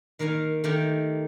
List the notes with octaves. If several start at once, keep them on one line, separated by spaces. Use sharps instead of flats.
D#3 A#3 A#4 F5 G#5
D#3 A3 A#3 G4